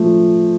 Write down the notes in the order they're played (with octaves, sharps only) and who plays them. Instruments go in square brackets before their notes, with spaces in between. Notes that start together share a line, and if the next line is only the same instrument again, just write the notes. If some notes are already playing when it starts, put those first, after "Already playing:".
Already playing: [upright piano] F3 A3